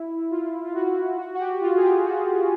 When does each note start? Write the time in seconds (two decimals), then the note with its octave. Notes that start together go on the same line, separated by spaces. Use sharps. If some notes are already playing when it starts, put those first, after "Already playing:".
Already playing: E4
0.31 F4
0.65 F4
0.74 F#4
1.18 F#4
1.35 F#4
1.39 G4
1.61 F4
1.76 G#4
1.83 G4
2.05 F#4